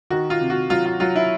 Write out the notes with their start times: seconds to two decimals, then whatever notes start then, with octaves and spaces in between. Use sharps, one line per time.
0.10 D#3 F#4
0.30 F4
0.40 C3
0.50 F#4
0.70 F#3 F4
0.86 F4
1.00 F#3 F4
1.16 E4